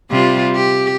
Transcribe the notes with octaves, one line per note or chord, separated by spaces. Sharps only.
C3 G3 F4
G4